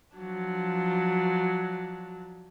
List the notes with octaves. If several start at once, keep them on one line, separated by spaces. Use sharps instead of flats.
F3 F#3 D4